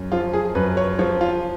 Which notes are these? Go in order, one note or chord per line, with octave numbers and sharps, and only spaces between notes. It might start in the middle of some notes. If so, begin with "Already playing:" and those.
Already playing: F#2
F3 F4
G#4
F#2 B4
C#5
F3 C#5
F4